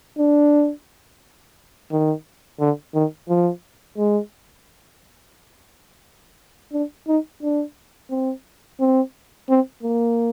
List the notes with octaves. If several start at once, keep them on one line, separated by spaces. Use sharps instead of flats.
D4
D#3
D3
D#3
F3
G#3
D4
D#4
D4
C4
C4
C4
A#3